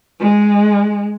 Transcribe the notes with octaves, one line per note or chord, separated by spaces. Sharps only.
G#3